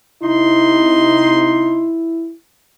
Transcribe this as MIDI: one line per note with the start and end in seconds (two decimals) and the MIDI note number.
0.23 1.91 48
0.23 1.91 63
0.23 2.33 64
0.23 1.91 84